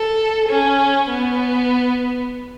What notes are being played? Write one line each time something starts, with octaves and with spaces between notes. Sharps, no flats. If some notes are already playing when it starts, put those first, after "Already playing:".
Already playing: A4
C#4
B3